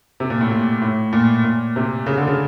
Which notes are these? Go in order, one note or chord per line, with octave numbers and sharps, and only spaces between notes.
C3
A#2
A2
A#2
A2
A#2
A#2
C3
C#3
D3
C#3